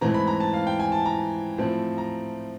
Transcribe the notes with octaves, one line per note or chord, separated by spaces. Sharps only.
G#2 E3 A3 C4 A#5
B5
A#5
A5
F5
G5
G#5
A5
A#5
A2 F3 A3 C4
A#5